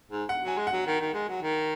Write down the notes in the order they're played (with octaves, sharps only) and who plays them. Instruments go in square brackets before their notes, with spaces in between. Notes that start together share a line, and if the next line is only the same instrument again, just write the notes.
[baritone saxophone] G#2
[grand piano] F#5
[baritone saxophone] F#3 [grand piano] G#5
[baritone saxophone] G#3
[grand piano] F#5
[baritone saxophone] F#3
D#3
D#3
G#3
F#3
D#3